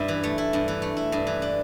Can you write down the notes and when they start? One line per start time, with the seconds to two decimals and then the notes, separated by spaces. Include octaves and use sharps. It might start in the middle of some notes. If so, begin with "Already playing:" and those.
Already playing: G2 E4
0.08 E3
0.24 A3
0.38 E4
0.53 G2
0.68 E3
0.82 A3
0.97 E4
1.12 G2
1.27 E3
1.42 D4